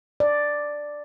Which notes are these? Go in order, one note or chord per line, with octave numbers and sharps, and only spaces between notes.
D5